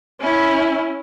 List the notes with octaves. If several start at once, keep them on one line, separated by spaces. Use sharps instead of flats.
C#4 E4